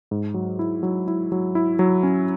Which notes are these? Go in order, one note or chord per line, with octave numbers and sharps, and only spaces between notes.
G#2
F#3
E4
F#3
E4
F#3
E4
F#3
C#4